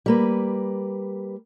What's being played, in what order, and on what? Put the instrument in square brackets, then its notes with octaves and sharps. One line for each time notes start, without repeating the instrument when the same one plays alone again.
[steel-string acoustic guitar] G3 A#3 B4